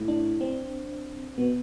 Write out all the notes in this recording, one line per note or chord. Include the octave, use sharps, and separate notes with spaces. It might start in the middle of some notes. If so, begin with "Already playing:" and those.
Already playing: A2
D4
C4
B2 B3